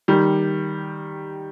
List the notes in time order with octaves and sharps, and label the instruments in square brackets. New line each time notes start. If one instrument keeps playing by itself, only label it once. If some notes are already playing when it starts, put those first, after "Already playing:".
[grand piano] D#3 G3